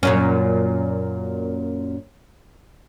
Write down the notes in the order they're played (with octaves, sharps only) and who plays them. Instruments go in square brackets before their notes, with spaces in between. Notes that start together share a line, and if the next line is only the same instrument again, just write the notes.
[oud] F#2 A#2 C#4